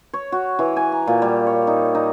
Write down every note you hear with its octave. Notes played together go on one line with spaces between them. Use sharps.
C#5
F#4
E3
G#5
A#5
A#2
G3
C#5
D#4
D#4